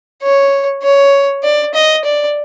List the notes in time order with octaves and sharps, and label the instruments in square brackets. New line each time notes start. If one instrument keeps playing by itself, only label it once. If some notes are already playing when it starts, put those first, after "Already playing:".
[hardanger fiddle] C#5
C#5
D5
D#5
D5